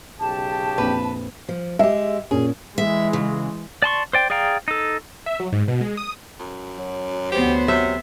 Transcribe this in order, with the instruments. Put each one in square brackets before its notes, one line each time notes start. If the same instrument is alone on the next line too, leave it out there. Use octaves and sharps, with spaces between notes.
[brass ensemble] B1 C#3 G4 [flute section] A5
[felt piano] A#1 F2 [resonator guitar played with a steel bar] B4
[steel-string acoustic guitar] F3
[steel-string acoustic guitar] G#3 G4 [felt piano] E5
[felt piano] A#2 C#4 [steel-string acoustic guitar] G#4
[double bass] E3 G#3 [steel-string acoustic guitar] E5
[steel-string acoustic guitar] C#3
[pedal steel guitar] D5 A5 C6 C#6
C5 D5 G5
G#4 D5 F5 G5 A#5
D#4 A4
[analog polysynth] E5
F#3
G#2
B2
G#3
D#6
[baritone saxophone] F#2
[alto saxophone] F#3
[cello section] D2 B3 C5 [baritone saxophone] G4
[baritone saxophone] C3 [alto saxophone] F#3 [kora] E5